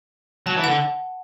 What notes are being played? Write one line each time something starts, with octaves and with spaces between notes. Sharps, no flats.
F#3 A5
E3
D3 F#5